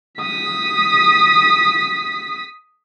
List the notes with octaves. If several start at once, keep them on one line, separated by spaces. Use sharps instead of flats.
D#6 B6